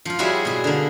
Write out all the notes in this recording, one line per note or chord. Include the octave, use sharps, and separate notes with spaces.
F3 F4
G3 E4 F#4 G#4 C#5 E5
B2 G#4
D3 A#3